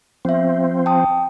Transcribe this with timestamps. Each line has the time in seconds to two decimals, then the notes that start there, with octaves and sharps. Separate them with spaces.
0.25 F3 B3 C4 E5
0.86 G5 A5 D#6